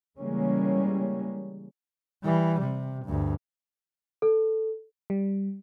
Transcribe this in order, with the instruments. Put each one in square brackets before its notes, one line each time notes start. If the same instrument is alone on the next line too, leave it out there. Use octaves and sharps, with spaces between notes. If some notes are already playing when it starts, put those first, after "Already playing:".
[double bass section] C#3 E3 G3 G#3 A#3 C#4
[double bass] E3 G3
C3
D2 G2
[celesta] A4
[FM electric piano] G3